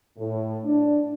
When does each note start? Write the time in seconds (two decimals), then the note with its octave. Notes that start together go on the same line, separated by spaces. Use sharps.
0.18 A2
0.64 D4